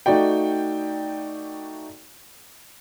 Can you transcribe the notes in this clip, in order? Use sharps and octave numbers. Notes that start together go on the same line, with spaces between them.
A3 D#4 F#4 D5 G5